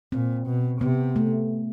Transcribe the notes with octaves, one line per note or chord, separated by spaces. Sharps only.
A#2 C4
B2
C3 B3
A3